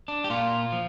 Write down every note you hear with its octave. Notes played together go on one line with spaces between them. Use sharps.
D4
G4
A#2 F4
F3